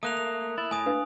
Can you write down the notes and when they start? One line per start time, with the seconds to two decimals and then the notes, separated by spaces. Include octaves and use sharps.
0.03 A3 A#3 D#6 F#6 F7
0.17 F7
0.58 E4 A6
0.71 A2 G#5 D#6
0.86 D4 B4 F5